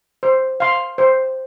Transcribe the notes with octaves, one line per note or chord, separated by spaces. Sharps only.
C5
F5 C6
C5